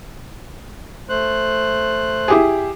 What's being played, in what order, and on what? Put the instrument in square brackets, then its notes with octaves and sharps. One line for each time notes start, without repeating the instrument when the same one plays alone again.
[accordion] A3 C5 F#6
[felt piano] E4 G4 G#4